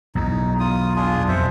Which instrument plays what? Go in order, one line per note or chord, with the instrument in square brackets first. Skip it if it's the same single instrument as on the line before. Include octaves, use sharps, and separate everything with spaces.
[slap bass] B1 E2 [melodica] D#4
[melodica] F4 D#6
D4 F4 G#4
[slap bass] F2 B2 [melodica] C5 E5